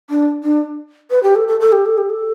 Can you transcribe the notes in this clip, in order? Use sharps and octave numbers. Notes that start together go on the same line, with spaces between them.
D4
D4
B4
G4
A4
A4
A4
G4
A4
G4
A4